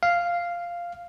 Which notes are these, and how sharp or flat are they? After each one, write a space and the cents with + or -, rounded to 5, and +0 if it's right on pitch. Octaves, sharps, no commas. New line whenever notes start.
F5 -5